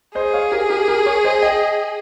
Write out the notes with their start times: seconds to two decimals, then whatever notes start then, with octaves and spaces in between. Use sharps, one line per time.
0.15 G#4 C5 D#5
0.34 C#5 F5
0.52 G4 A#4
0.69 G4 A#4
0.88 G4 A#4
1.06 A#4 C#5
1.24 C5 D#5
1.42 D#5 G5